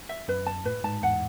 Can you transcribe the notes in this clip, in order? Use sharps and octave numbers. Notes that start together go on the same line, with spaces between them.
E5
F#2 B4
A5
A2 B4
G#2 A5
E2 F#5